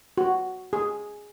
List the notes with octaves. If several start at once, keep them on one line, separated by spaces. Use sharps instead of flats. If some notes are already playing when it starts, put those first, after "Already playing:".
F#4
G#4